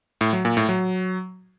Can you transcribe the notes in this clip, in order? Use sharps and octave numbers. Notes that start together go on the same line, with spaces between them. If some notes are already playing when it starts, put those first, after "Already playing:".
A2
F#3
A#2
A2
F#3